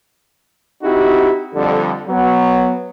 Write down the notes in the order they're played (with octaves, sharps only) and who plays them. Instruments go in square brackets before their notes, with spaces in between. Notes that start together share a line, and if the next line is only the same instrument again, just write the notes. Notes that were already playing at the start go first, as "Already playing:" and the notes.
[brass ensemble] C4 D#4 E4 F#4 G4
F2 D3 G3
F#3 B3